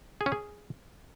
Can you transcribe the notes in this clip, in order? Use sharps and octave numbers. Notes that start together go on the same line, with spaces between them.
G#4
C#4
G#4